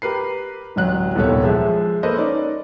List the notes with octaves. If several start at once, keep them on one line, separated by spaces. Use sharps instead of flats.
G4 A#4 B4 C7
D1 A1 F#3 F#6
D#1 C2 B3 A4 C#5
F3 G#3 E5
A#3 A4 B4 C5 D#5
C#4 D#4 D5